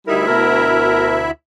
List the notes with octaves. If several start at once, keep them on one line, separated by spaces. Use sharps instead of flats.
D2 G3 D#4 E4 A#4 E5
B2 A#4